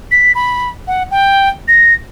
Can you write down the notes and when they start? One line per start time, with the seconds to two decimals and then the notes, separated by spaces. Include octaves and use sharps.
0.11 B6
0.35 B5
0.87 F#5
1.11 G5
1.68 A#6